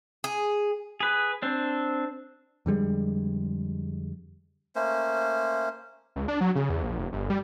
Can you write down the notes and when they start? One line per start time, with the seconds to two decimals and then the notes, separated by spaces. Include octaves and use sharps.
0.24 G#4
1.00 G#4 B4
1.42 C4 D4
2.66 F2 D3 G3 G#3
4.76 A3 A#3 C#4 C5
6.16 C#2
6.28 D4
6.41 F#3
6.55 C#3
6.70 E2
6.83 A#1
6.99 F1
7.13 G1
7.30 G3